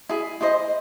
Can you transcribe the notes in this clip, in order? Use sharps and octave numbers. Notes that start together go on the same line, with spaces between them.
E4 G#4
E4 G#4 C5 D#5